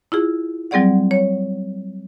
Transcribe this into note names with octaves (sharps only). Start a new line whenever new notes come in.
E4 F4 G#4
F#3 G3 C4 G#4 D5 F#5
C#5